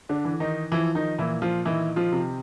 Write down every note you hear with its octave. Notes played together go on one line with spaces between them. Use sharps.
D3 D4
E3
D#3 D#4
E3 F3 E4
D#3 D#4
A#2 E3 E4
F3 F4
D#3 E3 E4
F3 F4
C3